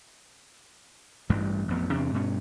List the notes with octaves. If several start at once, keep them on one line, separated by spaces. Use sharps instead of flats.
A1 G2 E3 G3
A1 F2 B3
E2 C3 D4
G2 B2 C#4